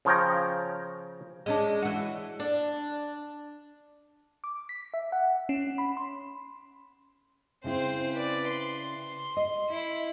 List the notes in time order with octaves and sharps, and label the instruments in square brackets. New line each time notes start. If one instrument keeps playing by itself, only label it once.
[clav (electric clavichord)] C#3 F3 C#5 G5 A#5
[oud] G#3 C#4 D4
E3 F#4
[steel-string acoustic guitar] D4
[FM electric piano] D6
B6
E5
F#5
C#4
B5
C6
[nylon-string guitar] C#3 E4 [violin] C4 C5
[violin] B4 D5
C6
[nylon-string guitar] D#5
[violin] E4